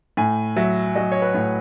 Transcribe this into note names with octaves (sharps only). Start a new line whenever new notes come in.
A2 G#5
F#3 E5
F#3 D#5
C#5
B4
A2